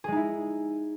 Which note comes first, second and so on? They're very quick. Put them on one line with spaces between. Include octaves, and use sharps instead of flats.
G#4 G#3 D#4 E4